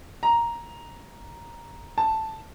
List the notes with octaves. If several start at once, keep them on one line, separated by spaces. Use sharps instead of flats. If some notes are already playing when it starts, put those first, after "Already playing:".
A#5
A5